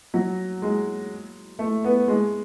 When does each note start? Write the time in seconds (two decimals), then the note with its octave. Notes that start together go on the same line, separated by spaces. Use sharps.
0.14 F#3
0.62 G#3
1.59 A3
1.84 B3
2.08 G#3